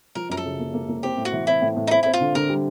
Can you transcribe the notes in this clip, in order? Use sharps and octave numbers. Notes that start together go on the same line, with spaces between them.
F3 A#4
F#2 A#4
A4
C#3
A#3
A#3
A#3
C4 G4
A2
F#4
E3
C4 E4
A2
A2
D#4
C4 E4
C4 E4
F4
D3
D3 A#4
G3